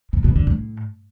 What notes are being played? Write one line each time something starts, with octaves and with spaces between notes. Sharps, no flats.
C3
B2
D3
A2